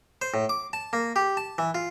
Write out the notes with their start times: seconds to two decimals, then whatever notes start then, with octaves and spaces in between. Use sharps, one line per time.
0.22 C5
0.34 A2
0.49 D6
0.73 A5
0.93 A#3
1.16 G4
1.37 A5
1.58 E3
1.75 F4